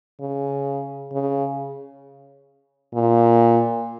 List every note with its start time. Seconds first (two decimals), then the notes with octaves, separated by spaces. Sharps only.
0.20 C#3
1.12 C#3
2.95 A#2